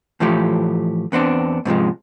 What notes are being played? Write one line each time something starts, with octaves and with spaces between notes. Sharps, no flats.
A2 E3 F3 A3 G4
E2 B3 C4 D4
G#2 C3 F3 G#3